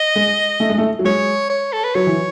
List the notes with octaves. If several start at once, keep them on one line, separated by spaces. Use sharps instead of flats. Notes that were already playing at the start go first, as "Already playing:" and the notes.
Already playing: D#5
G#3
A3
G#3
A3
F#3
G#3 C#5
C#5
A4
B4
F#3 C#5
E3